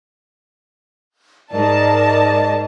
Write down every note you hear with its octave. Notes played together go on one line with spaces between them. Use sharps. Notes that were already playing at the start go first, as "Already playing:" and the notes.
G#2 G#3 A#4 D5 D#5 A5